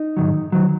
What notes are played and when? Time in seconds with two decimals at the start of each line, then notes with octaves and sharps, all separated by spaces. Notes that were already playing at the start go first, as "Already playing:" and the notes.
Already playing: D#4
0.17 G#2 D#3 F#3
0.52 D#3 F#3